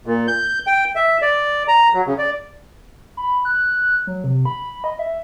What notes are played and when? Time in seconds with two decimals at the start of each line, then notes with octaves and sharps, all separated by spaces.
0.06 A#2
0.28 G6
0.67 G5
0.95 E5
1.22 D5
1.68 A#5
1.93 F#3
2.07 C#3
2.18 D5
3.17 B5
3.45 F#6
4.07 F#3
4.24 C3
4.45 B5
4.84 D#5
4.99 E5